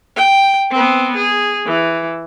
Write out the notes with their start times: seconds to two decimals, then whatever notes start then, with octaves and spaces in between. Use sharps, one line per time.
0.16 G5
0.71 B3 C4
1.16 G#4
1.66 E3